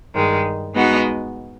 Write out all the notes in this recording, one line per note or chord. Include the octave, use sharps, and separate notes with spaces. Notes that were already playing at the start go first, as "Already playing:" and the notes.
G2 D#3 G#3
G#3 B3 D#4 F#4